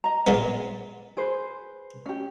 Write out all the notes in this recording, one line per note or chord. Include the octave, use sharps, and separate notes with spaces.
D#5 A#5
A#2 G#3 B3
G#4 B4 C5
C#4 G4